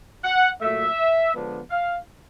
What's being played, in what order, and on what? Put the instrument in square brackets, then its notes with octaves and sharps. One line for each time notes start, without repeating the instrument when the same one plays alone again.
[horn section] F#5
A#2 F#3 A3 E5
D3 F3 G#3 B3 D4
F5